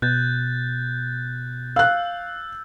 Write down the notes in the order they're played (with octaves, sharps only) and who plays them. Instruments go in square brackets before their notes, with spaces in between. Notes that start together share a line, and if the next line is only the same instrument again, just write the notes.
[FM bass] B2 [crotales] F#6 G6 A6
[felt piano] F5 F#6 [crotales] E6